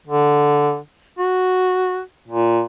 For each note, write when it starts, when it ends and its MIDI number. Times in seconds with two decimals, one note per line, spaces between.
0.07 0.78 50
1.18 2.00 66
2.28 2.62 46